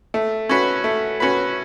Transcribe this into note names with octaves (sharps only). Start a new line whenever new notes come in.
A3
C#4 F#4 B4
A3
C#4 F#4 B4